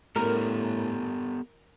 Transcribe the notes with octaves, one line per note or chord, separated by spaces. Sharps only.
A2 B3 G4 A4 A#4